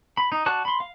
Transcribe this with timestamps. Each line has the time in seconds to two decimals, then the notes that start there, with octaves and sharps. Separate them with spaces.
0.17 B5
0.32 D#4
0.46 F#4 D5 A5 F#6
0.65 B5 C6
0.80 F5